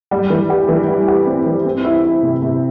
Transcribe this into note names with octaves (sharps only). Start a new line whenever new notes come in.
G3
E3
G4
E3
G3
G4
C4
E3
C4
E4
E4
C3
C3